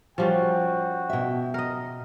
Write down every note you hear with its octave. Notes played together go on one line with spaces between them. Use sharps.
F3 G3 C#4 F#4 G5
B2 E5
A#4 D#5